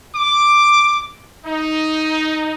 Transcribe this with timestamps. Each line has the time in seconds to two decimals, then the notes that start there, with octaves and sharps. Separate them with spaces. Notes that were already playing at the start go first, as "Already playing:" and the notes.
0.16 D6
1.46 D#4